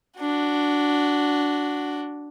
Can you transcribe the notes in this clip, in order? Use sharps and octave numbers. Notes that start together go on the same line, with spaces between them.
D4 F#4